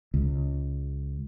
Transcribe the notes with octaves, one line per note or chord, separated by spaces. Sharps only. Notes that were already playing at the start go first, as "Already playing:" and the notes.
C#2